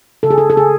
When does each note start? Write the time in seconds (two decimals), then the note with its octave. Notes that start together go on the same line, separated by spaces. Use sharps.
0.23 C#3 A4
0.30 G#4
0.38 A4
0.50 A4
0.57 C#3 G#4